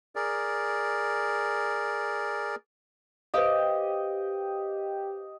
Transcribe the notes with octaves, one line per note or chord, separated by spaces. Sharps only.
G#4 A#4 D5
G4 B4 C5 D#5 F5